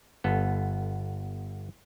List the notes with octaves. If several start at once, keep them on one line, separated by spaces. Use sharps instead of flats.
G1 B3 A4